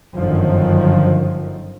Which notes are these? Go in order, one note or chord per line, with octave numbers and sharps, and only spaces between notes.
G1 F#2 D3 D#3 F3